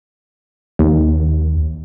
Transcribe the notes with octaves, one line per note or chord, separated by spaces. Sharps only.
D#2